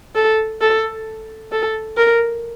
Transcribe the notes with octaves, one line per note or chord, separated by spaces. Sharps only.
A4
A4
A4
A#4